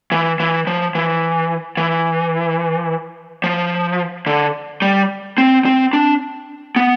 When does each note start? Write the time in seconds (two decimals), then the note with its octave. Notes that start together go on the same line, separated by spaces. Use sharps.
0.12 E3
0.40 E3
0.67 F3
0.95 E3
1.77 E3
3.44 F3
4.27 D3
4.82 G3
5.38 C4
5.65 C4
5.93 D4
6.76 B3